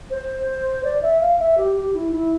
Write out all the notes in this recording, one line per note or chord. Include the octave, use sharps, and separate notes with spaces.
C5
D5
E5
F5
E5
G4
G4
E4
E4